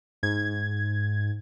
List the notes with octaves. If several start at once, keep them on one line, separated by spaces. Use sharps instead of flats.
G#2 G#6